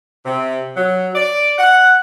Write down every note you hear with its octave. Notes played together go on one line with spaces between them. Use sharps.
C3
F#3
D5
F#5